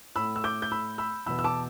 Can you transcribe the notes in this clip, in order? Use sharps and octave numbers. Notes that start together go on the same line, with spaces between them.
A2 A3 B5 E6
E6
D6 G6
G6
B5 E6
B5 E6
E2 B2 B3 B5 E6
E6
A5 D6